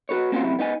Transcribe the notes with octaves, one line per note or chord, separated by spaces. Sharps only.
F#4 A4 B4 C#5
A#3 C4 C#4 F4 F#4 C5
F#2 C3 E4
B3 D#4 D5 G#5